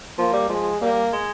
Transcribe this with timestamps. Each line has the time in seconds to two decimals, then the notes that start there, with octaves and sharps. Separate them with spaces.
0.18 F3 A#3
0.33 G3
0.49 F3 G#3
0.81 G3 A#3
1.12 G#3